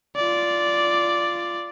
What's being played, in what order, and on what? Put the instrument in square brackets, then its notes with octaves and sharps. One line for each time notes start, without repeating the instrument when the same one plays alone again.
[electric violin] F4 D5